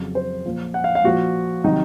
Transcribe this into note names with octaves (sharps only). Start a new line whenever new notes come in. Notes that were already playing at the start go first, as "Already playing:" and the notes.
Already playing: F2 C#3 F#3
C5
A#2 F3
F#5
F5
F5
A#2 F3 F#4
C3 D#3 F#3 D#4